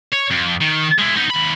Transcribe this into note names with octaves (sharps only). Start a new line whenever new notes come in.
C#5
F2
D#3
G#3 E4
B3 D#4
D#2 B5